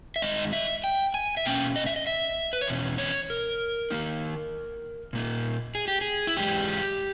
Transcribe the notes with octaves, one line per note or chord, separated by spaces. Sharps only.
E5
G2 D#3 G#3 D#4 D#5
E5
G5
G#5
E5
B2 A#3 C#4 G5
D#5
E5
D#5
E5
B4
C#5
E2 B2 C#4
C#5
A#4
D#3 A#3 D#4
A#2 A#3 D#4
G#4
G4
G#4
E4
G#2 E3 G#3 G4